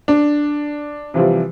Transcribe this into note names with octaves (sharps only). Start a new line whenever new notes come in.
D4
C3 E3 F3 G3